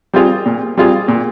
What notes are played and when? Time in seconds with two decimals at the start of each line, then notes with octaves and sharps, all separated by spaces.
0.13 G3 C4 F4 G#4
0.46 A#2
0.77 G3 C4 F4 G#4
1.08 A#2